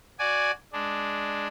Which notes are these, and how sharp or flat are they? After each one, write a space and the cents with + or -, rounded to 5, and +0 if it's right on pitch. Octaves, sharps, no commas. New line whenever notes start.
F#4 +0 D5 +0 G#5 +0
G#3 +0 D4 +0